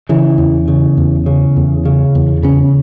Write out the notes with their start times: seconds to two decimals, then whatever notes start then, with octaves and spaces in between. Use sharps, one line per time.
0.09 C#3 E3
0.38 E2
0.68 C#3
0.97 E2
1.26 C#3
1.56 E2
1.85 C#3
2.15 E2
2.43 C#3 C#4